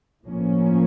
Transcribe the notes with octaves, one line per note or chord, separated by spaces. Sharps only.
A2 F3 A#3 C#4